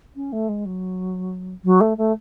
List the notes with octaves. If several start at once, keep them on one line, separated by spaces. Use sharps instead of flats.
C#4
A3
G#3
F#3
F#3
A3
A3